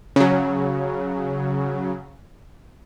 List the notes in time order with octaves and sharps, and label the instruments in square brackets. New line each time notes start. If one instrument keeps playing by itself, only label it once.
[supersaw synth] C#3 F#3